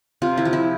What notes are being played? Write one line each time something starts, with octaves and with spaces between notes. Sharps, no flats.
C3 F4
E4
F3
E4